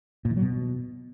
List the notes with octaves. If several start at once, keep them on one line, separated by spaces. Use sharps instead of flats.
A#2
E3
F#3
B2